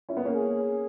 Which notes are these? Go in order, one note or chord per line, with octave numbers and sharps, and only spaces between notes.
C#4 E4
B3
A#3 C#4
G#4